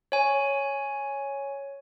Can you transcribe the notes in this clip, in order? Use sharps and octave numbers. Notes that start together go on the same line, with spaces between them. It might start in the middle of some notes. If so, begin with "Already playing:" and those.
C#5 G#5